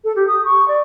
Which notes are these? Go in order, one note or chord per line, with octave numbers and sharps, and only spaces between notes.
A4
G4
D#6
C#6
D5